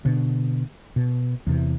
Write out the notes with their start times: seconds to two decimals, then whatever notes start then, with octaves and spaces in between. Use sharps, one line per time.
0.05 B2 D3
0.96 B2
1.47 E2 C3 E3